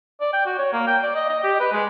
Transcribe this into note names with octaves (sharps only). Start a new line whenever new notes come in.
D5
G5
F#4
C#5
A#3
G5
D5
D#5
D#5
G4
B4
G#3